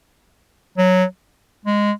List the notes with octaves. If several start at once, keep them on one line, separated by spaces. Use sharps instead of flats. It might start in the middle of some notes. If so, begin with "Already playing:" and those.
F#3
G#3